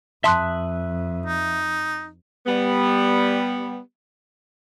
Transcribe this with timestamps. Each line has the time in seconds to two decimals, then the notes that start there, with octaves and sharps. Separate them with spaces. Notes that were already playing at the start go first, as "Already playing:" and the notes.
0.24 F2 E5 A5 C6 D#6 F#6
1.26 D#4
2.47 G3 B3